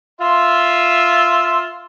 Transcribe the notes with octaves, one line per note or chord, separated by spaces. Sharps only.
F4 E5 C6